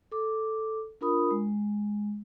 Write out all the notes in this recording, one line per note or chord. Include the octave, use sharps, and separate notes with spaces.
A4 D6
D4 F4 A#4 B5 D#6
G#3